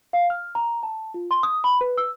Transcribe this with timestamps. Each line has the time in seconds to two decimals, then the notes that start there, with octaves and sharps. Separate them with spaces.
0.13 F5
0.30 F6
0.55 A#5
0.83 A5
1.14 F4
1.31 C6
1.43 D#6
1.64 B5
1.81 B4
1.98 E6